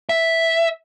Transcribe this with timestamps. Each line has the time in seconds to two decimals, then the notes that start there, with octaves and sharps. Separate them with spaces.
0.09 E5